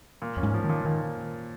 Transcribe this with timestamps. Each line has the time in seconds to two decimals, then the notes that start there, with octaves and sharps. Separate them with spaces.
0.22 A#2
0.37 F2 C#4
0.43 G#2
0.54 F3
0.64 A#2 D#3
0.85 A#2 D#3